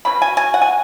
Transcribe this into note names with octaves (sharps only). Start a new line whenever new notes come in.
B2 F#3 C#4 B5
G#5
G#5
F#5
G#5